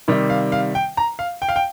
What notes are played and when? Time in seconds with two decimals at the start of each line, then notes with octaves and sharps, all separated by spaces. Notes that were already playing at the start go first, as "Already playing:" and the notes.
0.08 C3 D#3 G3
0.30 F5
0.52 F5
0.75 G5
0.97 A#5
1.19 F5
1.42 G5
1.49 F5
1.56 G5